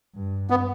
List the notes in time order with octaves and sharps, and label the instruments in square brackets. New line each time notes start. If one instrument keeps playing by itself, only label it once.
[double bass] G2
[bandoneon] B3